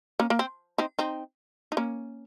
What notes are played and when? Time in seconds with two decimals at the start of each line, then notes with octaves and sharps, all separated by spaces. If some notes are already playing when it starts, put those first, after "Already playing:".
0.20 A#3 C#4
0.30 A#3
0.39 C4
0.78 C4 D#4
0.99 C4 D#4
1.72 D#4
1.77 A#3 C#4